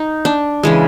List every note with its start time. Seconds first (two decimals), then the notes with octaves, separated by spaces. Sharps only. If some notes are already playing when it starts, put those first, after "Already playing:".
Already playing: D#4
0.25 D4
0.63 C#3 E3 G#3